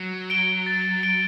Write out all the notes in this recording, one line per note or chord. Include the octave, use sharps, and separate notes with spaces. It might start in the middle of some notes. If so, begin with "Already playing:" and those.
Already playing: F#3
D7 G7
A6
D7 G7